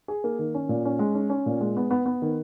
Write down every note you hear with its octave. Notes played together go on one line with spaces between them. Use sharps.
G#4
A#3
D#3
C#4
A#2
C#4
G#3
C#4
C#4
A#2
G#3
B3
B3
B3
D#3